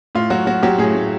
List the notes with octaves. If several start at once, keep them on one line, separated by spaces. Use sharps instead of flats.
A2 F4
F#3 F#4
F#3 F#4
F#3 G4
A2 G#4
A2